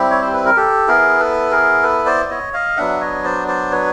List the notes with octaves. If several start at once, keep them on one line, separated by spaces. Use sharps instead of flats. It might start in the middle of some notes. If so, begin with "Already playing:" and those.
Already playing: G3 C4 E4 G4
C#5
C5
B4
A#4
G4 A4
B3 E4 G#4 A#4
A4 B4
G#4 A#4
A4 B4
C5 D5
D5
C#5 D#5
D#5 F5
F#3 B3 D4 E5 F#5
C#5 D#5
C5 D5
C5 D5
B4 C#5